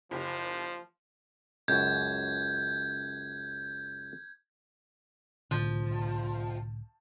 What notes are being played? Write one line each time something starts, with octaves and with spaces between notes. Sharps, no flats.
F#1 F3 G4
C#2 F#2 G6 G#6
C2 A2 D3 F3